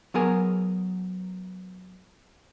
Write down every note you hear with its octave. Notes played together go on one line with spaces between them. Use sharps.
F#3 B3 G#4 A#4 G#5